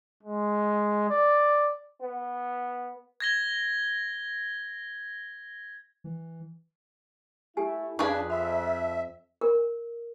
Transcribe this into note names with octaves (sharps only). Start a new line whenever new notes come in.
G#3
D5
B3
G#6 A#6 G7
E3
A3 E4 G4 G#5
F2 C#3 D4 G#4 B4 F5 G#5 C#6
E5 B5
A#4